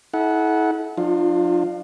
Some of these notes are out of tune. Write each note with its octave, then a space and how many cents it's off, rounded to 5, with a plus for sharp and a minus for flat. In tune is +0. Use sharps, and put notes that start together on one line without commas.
E4 -35 A4 -40 F#5 +0
F3 +35 D4 +45 F4 +0